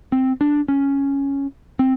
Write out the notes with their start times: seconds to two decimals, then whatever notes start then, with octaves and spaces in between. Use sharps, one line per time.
0.12 C4
0.41 D4
0.68 C#4
1.79 C4